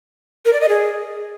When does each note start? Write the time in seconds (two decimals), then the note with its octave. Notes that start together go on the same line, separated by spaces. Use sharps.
0.45 A#4
0.53 D5
0.61 D#5
0.69 G#4